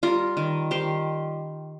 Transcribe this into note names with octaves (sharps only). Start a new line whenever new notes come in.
G3 F4 A#4
D#3
D#3 G4 C5